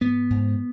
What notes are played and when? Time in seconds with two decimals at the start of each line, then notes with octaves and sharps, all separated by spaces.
0.01 G#2 B3
0.30 G#2